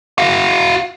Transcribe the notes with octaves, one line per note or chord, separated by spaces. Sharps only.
F#4 F5